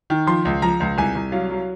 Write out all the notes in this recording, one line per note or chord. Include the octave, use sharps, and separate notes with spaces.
D#3
F3 C6
C#2
F3 A#5
C#2
C2 G#5
C2
F#3 F5
F#3